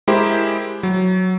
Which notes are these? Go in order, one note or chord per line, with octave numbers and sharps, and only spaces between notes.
G#3 E4 G4 A#4 C5
F#3